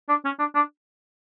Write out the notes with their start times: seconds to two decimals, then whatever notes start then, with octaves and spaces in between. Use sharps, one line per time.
0.09 D4
0.25 C#4
0.39 D4
0.55 D4